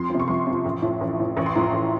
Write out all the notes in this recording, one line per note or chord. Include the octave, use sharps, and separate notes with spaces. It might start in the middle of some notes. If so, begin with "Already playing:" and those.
Already playing: F2 C6
C3 F3
C#6
F2 C6
C3 F3
A1
A2 F3
A1
A2 F3
A1 C#6
C6
A2 F3 A#5
C6
A1